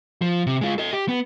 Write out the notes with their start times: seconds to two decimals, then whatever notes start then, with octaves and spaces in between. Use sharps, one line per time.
0.22 F3
0.47 C3
0.61 G#3 F4
0.78 A4 D#5
0.93 G4
1.09 B3